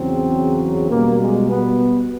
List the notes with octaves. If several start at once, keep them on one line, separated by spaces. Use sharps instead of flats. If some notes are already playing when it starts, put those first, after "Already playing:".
Already playing: E2 C#3 F#3 C4
B2 G3 A#3
G#3
B3